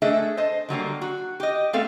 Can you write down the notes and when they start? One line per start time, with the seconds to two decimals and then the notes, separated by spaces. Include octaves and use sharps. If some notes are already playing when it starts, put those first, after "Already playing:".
0.02 A3 D4 G#4 A4 D#5 E5
0.37 C5 D#5 A5
0.69 D3 F#3 G3 A#3
1.01 F#4
1.40 G4 D#5
1.73 A3 B3 C4 A4 F5